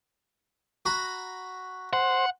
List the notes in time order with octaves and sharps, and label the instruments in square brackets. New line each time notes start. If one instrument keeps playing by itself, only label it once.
[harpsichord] F#4 A#5 B5
[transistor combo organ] C5 [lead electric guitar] F#5